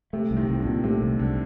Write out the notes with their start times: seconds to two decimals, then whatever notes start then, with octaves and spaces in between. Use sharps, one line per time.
0.13 C3 A3
0.31 C2
0.37 C3 D#3
0.49 C2
0.60 D3
0.66 A#2
0.84 C3 A3
1.02 C2
1.19 C2 D3